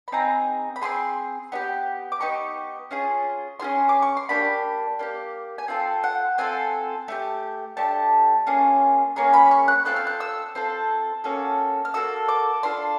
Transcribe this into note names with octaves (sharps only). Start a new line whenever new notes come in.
B5
C4 D#4 G#4 A#5
B5
C4 D#4 G#4 C6
B3 D#4 G4
D6
B3 D#4 G4 C#6
C#4 F4 G#4
C#4 F4 G#4 C6
D6
C#6
C6
A#3 D4 G4 B5
A#3 D4 G4
G#5
C4 F4 A4 G5
F#5
C4 F4 A4 G#5
A3 D4 G4
A3 D4 G4 A5
A#3 C#4 F4 G#4
A#3 C#4 G#4 A#5
B5
C#6
F#6
C4 F4 A4 F#6
F6
F#6
E6
C4 F4 A4
A#3 C#4 F#4 A4
F6
A#3 C#4 F#4 A4 E6
D6
D4 F4 A4 C6